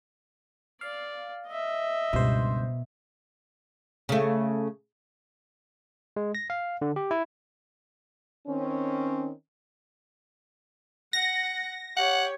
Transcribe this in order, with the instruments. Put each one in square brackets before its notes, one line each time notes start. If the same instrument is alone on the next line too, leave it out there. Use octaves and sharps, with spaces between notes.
[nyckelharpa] D5 [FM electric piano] F5
[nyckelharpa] D#5 E5
[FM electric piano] C#2 G2 C5 [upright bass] B2
[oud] C#3 A3
[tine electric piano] G#3
A#6
F5
D3
G4
E4
[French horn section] D#3 C4 C#4
[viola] F#5 [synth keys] A#6
[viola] G4 C#5 [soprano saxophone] F#5